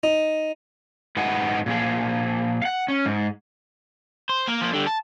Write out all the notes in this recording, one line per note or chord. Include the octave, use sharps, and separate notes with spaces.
D#4
G#2 B3 D#4 F#5 G#5
A#2 F3 G#4
F5 F#5
C#4
G#2
C5
A#3
F3 A#3
D3 G3
A5